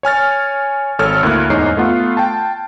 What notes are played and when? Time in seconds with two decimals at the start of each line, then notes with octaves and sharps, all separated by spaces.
0.03 C#5 G#5 F6 A6
0.99 G#1 A4 C#5 F6
1.23 D2 A#3 E4 F#6
1.50 E2 G#2 D#4 C#5 C7
1.77 A3 B3 F4 F#5
2.17 G5 A5